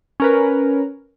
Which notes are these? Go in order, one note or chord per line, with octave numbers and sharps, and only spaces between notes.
C#4 A#4 B4